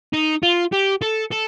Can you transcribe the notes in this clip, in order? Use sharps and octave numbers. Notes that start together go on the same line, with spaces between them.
D#4
F4
G4
A4
A4